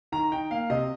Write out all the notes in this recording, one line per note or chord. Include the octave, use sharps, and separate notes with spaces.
D#3 A#5
D#4 G5
A#3 F5
C3 D#5